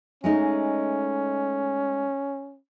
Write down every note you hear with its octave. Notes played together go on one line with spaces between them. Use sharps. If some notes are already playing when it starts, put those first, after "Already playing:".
G#3 A3 C#4 D#4